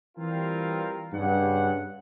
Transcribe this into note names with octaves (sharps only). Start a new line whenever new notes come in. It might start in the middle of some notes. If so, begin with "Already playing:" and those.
E3 G3 C4 F4 A#4
G2 C#3 F#5